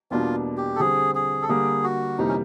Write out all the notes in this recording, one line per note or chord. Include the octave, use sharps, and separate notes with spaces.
E2 B2 G3 A#3 D4 F4
G4
A4
D3 G3 C4 G#4
G#4
A4
D3 G3 A#3 G#4
F#4
F2 C3 E3 G3 A#3 D#4
C#4